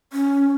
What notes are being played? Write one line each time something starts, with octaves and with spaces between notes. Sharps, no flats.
C#4